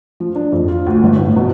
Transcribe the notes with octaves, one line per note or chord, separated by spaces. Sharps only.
F3
D4
F2
F4
D2
G1
A2
B2